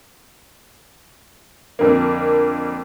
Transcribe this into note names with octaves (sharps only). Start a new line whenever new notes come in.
F2 D3 A#3